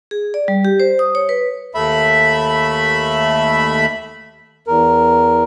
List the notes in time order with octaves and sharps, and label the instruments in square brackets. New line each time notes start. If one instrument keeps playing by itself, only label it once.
[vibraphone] G#4
D5
G3
G4
C5
D#6
C#5
B4
[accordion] D#2 A3 E5 B5
E2 A#4